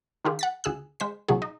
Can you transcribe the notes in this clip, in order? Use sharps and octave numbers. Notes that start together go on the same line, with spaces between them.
D#3 F4 G4 G#4
F#5 A6 B6
D2 G#4 E6 F#6
G#3 C5 B6
A#1 C3 F#3 G#4
D#4